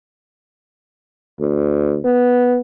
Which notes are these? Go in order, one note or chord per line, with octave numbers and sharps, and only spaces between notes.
D2
B3